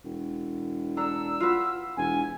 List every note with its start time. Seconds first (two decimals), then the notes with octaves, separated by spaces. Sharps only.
0.04 E1
0.97 D4 A4 A#5 E6
1.40 F4 F#4 B4
1.97 E1 G#5